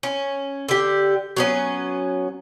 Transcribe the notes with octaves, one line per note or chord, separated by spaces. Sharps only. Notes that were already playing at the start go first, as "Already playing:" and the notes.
C#4
D3 G4
F#3 B3 C#4